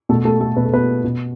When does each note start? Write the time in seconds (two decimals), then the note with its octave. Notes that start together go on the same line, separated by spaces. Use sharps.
0.09 B2 A3 A4
0.25 A3 A4
0.41 A3 A4
0.57 B2 B4
0.65 A4
0.74 B3 B4
1.04 B2